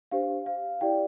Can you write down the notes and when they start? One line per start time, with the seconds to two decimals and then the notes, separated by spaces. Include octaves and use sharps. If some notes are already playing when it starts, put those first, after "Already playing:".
0.11 D4 G4 C5 F5
0.46 F5
0.81 E4 G4 D5 G5